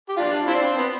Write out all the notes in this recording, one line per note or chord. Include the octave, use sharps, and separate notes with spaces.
G4
D4 F4
C4 E4
D4
C4
B3